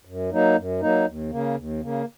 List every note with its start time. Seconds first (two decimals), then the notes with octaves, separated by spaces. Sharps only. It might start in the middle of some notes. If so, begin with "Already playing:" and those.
0.05 F#2
0.30 F#3 A#3 D#4
0.56 F#2
0.81 F#3 A#3 D#4
1.06 D#2
1.31 C#3 A#3
1.56 D#2
1.81 C#3 A#3